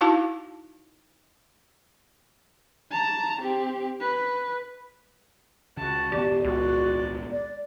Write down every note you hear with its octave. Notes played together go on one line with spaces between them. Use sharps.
D#4 E4 F#4 F5 A5 D6
A5 A#5
C4 G4
B4
C#2 C#3 F#4 A5
D#1 G#1 B3 G4 D5
C#2 G#3 F#4 D5
D5